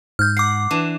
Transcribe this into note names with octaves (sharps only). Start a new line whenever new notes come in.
G#2 F6 G6
F#5 D6 C7
E3 D4